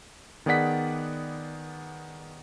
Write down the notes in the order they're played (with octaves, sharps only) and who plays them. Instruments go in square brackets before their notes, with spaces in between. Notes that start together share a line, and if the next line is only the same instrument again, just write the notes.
[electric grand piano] D#3 B3 G#4 D5 F#5 B6